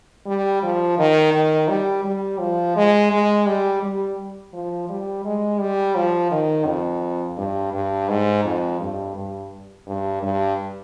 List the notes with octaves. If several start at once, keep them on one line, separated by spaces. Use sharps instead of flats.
G3
F3
D#3
D#3
G3
G3
F3
G#3
G#3
G3
G3
F3
G3
G#3
G3
F3
D#3
F2
G2
G2
G#2
F2
G2
G2
G2
G2